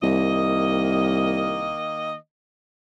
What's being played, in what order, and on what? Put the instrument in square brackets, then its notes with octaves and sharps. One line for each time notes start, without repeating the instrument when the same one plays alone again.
[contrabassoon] C2 [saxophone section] D#3 A#3 D#5